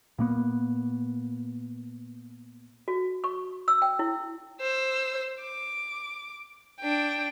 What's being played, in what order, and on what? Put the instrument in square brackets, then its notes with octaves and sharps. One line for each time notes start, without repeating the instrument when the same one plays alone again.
[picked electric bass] A#2 A#3 B3
[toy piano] F#4
C#6
E6
G5
E4
[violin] C5 E6
D6
D4 G5